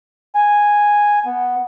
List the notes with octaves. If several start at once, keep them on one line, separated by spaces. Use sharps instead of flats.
G#5
B3